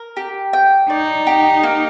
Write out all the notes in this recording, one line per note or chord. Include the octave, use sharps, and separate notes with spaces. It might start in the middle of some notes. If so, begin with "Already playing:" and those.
Already playing: A#4
G4
G5
D#4 D5
G4
A#3